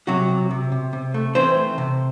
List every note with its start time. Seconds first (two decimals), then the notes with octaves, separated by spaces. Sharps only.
0.07 C3 F#3 F#4
0.28 C3
0.51 C3
0.72 C3
0.93 C3
1.14 A3
1.35 E3 C4 C5
1.57 A3
1.78 C3